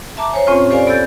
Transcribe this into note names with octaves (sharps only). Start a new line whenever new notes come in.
E5 A5 A#5 D6
C5 C#5 G#5
E2 A2 C4 C#4 F4 C#5
G4 A4 C5 D5 F5 G#5
B3 A4 E6 G6 A6